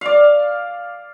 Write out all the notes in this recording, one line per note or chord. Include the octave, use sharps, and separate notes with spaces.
D5 F5